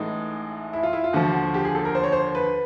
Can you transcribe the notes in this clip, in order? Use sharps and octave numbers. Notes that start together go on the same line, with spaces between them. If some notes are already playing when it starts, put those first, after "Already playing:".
Already playing: A1 A2 E3 G#3 D#4
E4
F4
E4
F4
D#2 D3 F3 F#4
G4
G#4
A4
A#4
C5
C#5
C5
B4